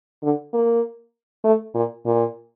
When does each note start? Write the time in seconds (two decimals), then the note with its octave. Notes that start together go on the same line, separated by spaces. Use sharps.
0.23 D3
0.53 A#3
1.44 A3
1.75 A#2
2.06 A#2